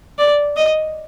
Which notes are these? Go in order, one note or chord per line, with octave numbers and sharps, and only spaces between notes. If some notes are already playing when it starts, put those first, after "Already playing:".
D5
D#5